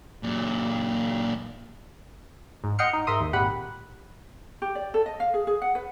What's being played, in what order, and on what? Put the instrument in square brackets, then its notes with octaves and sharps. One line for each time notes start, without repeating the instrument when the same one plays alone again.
[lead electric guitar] F#2 A#2
[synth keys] G#2
D#5 F#5 G5 C6 F6 C#7
D#4
G#2 A#4 E5 C6 D#6
D#2
G#1 A#2 G4 F#5 B5
[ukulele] G4
D5
A4
D#5
F5
G#4
G#4
F#5
B4